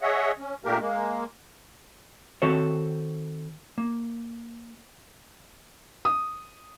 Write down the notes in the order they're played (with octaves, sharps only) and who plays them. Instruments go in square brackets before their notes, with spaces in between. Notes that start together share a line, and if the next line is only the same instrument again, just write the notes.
[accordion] G#4 C#5 D#5 E5 F#5
C#4
A#2 A3 A#3 D4 G4 A#4
G#3 A#3
[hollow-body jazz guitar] D#3 C4 F#4 A4 C5 C#5
A#3
[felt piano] D#6